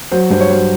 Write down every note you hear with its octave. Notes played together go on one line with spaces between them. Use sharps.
F#3 C5
G2 C5
C#5
F#3 C5